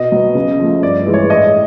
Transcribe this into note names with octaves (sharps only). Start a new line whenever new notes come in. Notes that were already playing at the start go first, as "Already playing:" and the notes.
Already playing: B2 D#5
F#3 B3
C#3
F3 A3
G2 D5
E3 G#3
C#5
A2 D#5